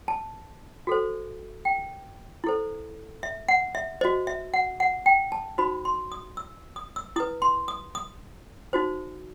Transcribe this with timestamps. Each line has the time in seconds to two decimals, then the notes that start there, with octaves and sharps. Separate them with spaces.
0.08 A5
0.87 F#4 A4 C5
1.65 G5
2.44 E4 A4 C5
3.23 E5
3.48 F#5
3.75 E5
4.01 F#4 C5 D#5
4.27 E5
4.54 F#5
4.80 F#5
5.06 G5
5.32 A5
5.58 D#4 F#4 C5 B5
5.85 C6
6.12 D#6
6.37 E6
6.76 D#6
6.96 E6
7.16 E4 B4 D#6
7.42 C6
7.68 D#6
7.95 D#6
8.73 D#4 F#4 C5